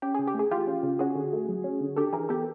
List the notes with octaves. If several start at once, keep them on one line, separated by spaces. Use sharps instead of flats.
C#4 G4
C#3 G#4
G4
A3 G#4
E3 F4 G4
C#4
C#3
C#4 F#4 G#4
D3
A3
F#3
C#4
D3
D4 G4 A4
E3 G#4 A#4
B3 G4 A4